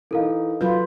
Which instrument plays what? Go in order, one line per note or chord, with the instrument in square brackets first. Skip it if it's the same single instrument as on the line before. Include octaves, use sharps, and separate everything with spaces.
[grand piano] E3 D#4 [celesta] A4 A#4 F5
[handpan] F#3 F4 B4 [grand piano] G6